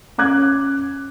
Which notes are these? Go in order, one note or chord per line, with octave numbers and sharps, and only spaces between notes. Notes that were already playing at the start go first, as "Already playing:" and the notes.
C#4 D6 F#6 G#6